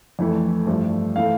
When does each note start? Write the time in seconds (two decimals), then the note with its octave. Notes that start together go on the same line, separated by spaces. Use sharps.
0.19 F2 E3 A3
0.67 G2 F3 A3
1.16 E3 A3 F5